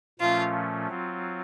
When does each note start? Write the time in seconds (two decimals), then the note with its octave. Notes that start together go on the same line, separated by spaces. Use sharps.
0.20 A#2 F3 A3 C#4 F4
0.87 F#3 C4 F4